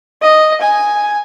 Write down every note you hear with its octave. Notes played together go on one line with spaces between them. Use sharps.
D#5
G#5